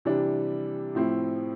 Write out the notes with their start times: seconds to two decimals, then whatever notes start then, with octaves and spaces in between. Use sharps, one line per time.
0.05 C3 E3 G3 D4
0.95 A2 F3 C4 E4